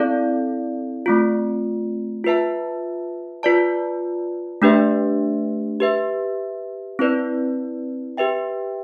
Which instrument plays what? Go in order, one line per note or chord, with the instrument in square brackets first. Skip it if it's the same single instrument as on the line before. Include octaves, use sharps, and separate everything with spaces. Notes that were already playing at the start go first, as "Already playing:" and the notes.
Already playing: [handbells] C4 E4 A4 D5 F5
A3 C4 F4
F4 B4 E5 A5
F4 B4 D5 A5
A3 D4 G4 B4 E5
G4 B4 E5
C4 E4 B4 D5
G4 B4 E5 G5